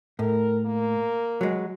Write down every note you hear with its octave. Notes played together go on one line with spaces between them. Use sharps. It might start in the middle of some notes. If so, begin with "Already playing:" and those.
A2 A#4
A#3
F#3 G#3